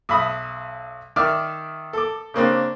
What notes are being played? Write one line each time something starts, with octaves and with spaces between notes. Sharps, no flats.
B1 E5 B5 D#6
D#3 D5 E5 F6
A4 D6
C#3 A#3 C4 D4